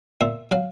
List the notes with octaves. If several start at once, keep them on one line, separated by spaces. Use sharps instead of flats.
A#2 E5
F#3 F5